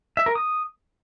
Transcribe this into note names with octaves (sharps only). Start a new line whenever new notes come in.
E5
A#4
D#6